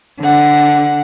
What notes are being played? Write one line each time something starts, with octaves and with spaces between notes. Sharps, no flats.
D3 F#5